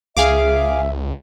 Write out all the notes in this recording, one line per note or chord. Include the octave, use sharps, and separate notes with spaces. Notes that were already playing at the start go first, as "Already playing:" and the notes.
C#2 G#4 E5 F5 D6